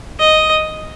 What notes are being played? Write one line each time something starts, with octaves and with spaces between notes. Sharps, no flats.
D#5